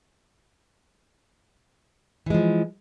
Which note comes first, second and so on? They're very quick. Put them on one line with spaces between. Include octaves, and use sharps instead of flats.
E3 G#3 F3